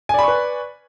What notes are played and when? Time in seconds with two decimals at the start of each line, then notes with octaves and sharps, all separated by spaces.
0.09 G#5
0.14 D5
0.19 B5
0.23 C#6
0.28 B4